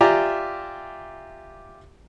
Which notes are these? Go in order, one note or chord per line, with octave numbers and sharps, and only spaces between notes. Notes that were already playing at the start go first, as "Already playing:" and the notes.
F4 G4 D5 E5 G#5 A#5